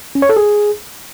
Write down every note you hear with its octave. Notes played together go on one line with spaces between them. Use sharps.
C#4
C#5
A4
G#4